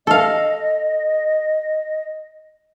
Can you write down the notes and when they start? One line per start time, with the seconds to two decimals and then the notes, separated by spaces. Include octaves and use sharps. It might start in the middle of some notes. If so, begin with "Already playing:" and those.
0.07 A4 D#5 F5